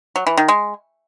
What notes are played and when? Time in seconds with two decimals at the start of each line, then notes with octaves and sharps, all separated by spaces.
0.16 F#3
0.27 E3
0.38 D#3
0.48 G#3